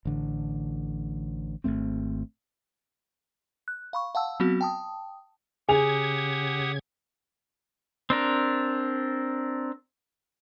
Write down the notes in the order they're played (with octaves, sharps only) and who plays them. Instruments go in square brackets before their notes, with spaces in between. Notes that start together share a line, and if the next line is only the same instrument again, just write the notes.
[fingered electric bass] A1 D3
G#1 G2 A3 C4
[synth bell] F#6
F5 B5 C#6
F5 F#5 A5 E6
F#3 B3 C4 F#4
G5 A5 D#6
[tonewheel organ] C#3 G#6 [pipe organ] G4 F#5 D#6 [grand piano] G#4 F7
[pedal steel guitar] C4 D4 A#4